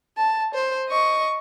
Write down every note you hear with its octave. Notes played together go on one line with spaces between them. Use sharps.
A5
C5
D#5 C#6